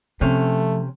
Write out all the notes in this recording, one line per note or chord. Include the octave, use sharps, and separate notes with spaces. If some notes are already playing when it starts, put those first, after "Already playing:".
C3 F3 A3 C#4